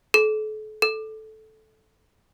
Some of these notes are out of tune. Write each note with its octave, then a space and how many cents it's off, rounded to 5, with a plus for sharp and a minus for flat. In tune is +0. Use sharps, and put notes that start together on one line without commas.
A4 -35
A4 -10